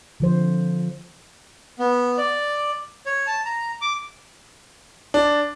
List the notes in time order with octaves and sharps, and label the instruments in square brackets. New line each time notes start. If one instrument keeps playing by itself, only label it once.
[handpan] D3 F3 C5
[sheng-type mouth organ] B3
D5
C#5
A5
A#5
D6
[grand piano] D4